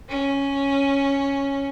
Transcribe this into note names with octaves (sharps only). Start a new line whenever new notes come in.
C#4